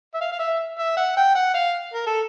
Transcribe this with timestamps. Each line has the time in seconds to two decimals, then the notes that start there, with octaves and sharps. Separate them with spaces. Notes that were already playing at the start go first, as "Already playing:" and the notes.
0.15 E5
0.21 F5
0.32 F5
0.40 E5
0.78 E5
0.97 F#5
1.17 G5
1.35 F#5
1.55 F5
1.94 A#4
2.07 A4